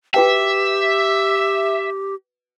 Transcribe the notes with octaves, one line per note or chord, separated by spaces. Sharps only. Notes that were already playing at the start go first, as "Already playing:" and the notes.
F#4 G4 B4 E5 G5